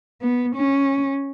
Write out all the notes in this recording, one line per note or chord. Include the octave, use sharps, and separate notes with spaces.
B3
C#4